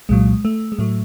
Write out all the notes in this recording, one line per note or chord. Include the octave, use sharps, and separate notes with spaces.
C2 A#2 F#3 G#3
A3
G#3
A2 F#3 A3